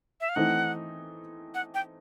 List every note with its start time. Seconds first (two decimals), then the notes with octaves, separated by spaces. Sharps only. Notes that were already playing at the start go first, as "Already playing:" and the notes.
0.21 E5
0.29 F5
0.35 E3 A3 C4 D#4 F#5
1.55 F#5
1.75 G5